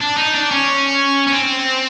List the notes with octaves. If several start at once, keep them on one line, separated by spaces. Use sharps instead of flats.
D4
D#4
D4
C#4
C#4
C4